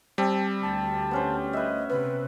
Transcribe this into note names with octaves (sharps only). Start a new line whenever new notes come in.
G3 C4 A5
D2 A5
B3 C#4 C5
B4 D#5 E5
C3 B3 B4